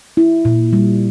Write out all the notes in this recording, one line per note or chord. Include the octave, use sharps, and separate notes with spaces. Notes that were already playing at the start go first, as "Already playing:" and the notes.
E4
A#2
G3